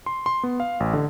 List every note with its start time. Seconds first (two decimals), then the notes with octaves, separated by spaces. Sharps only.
0.06 C6
0.26 C6
0.43 B3
0.60 F5
0.80 A1
0.93 D3